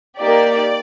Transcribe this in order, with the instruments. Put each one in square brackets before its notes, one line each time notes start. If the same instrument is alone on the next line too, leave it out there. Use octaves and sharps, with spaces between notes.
[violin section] A#3 D#4 G4 D5